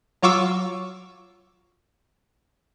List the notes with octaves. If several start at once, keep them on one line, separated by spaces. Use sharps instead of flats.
F#3 F4 C#6 D6 E6